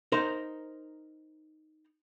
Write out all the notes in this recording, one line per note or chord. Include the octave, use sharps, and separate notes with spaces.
D#4 A#4 C5